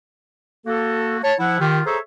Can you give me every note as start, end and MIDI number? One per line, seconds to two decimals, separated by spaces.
0.66 1.18 58
0.66 1.18 66
0.66 1.18 69
1.23 1.34 73
1.23 1.34 81
1.39 1.57 53
1.39 1.57 64
1.39 1.57 78
1.61 1.81 51
1.61 1.81 65
1.61 1.81 67
1.86 1.98 68
1.86 1.98 69
1.86 1.98 72
1.86 1.98 73
1.86 1.98 76
1.86 1.98 82